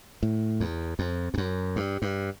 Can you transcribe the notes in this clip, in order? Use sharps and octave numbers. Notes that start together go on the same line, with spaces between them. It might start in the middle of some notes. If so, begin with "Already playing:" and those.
A2
E2
F2
F2
F#2
G2
G2